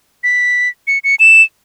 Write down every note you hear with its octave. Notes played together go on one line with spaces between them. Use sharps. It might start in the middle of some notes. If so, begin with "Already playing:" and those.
B6
C#7
C#7
E7